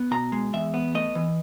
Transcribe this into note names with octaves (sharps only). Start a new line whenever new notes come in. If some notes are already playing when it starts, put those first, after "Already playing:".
Already playing: B3
B2 A#5
G#3
E2 E5
B3
A3 D#5
E3